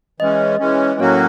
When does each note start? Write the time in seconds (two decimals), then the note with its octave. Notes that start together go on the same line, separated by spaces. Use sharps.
0.20 E3 G#3 C#4 D#5
0.59 E3 G#3 C#4
1.00 A2 F#3 A#3 C#4 F#4 C#5